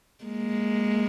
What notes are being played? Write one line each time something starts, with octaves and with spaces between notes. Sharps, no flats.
G#3 A#3